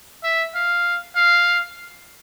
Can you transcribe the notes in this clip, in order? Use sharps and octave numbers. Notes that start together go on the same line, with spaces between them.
E5
F5
F5